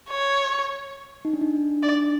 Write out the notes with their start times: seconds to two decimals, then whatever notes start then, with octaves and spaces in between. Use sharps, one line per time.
0.10 C#5
1.25 D#4
1.33 D4
1.41 D#4
1.55 D4
1.83 D4 D5